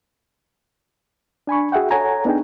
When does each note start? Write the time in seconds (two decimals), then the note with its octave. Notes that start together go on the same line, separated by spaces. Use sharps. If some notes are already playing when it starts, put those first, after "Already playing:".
1.47 D4 G#5 B5 C#6
1.72 F#4 G#4 E5 F#5 G5
1.91 A4 C#5 F#5 G#5 A#5
2.25 B3 D4 D#4 G#4 G5